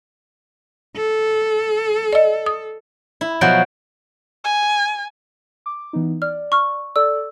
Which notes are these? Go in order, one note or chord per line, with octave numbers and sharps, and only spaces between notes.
A4
D5 D#5
D#6
E4
B2 F3 F#3 F#5 G6 D7
G#5
D6
E3 B3 D#4
D5 F6
C#6 F6
A4 D5 E6